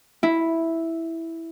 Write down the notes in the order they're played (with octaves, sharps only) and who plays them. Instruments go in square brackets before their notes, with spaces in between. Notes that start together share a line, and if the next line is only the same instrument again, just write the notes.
[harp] E4